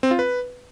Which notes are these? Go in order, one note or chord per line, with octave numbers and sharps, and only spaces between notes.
C4
F4
B4